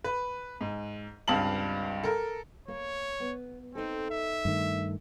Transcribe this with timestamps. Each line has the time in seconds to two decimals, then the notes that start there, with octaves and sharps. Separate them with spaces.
0.04 B4
0.61 G#2
1.28 C#2 G2 C4 F5 A5 F#7
2.03 A4 A#4
2.68 A#3 C#5
3.20 B3
3.75 C4 D#4 A4
4.10 E5
4.45 G2 D#3 A3